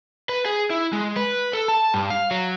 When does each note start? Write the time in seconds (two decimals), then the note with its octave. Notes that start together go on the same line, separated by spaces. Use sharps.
0.29 B4
0.46 G#4
0.70 E4
0.93 G#3
1.16 B4
1.53 A4
1.68 A5
1.94 G2
2.10 F5
2.31 F#3